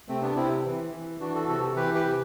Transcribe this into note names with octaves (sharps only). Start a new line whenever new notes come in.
C3 A3 C4
B3 D4
C3 C4 E4
E3
E3
E3 D4 F#4
F#4 A4
C3 F#4 A4
E3 G4 B4
G4 B4
C3